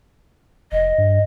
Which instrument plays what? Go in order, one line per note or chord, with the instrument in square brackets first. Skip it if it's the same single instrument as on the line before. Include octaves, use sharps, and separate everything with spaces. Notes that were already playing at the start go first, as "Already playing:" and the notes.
[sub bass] F1 [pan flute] D#5
[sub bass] G2